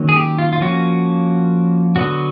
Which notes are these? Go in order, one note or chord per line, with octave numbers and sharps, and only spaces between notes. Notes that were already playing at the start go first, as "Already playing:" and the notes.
Already playing: D#3 F#3 A#3 C#4
G#4
G4
F4
F4
F3 A#3 C#4 F#4
D3 F#3 B3 F#4